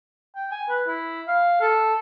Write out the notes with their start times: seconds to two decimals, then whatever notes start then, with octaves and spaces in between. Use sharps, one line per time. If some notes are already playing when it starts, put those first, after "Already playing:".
0.35 G5
0.51 G#5
0.69 B4
0.88 E4
1.27 F5
1.61 A4